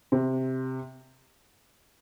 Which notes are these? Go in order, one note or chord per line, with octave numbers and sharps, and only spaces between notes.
C3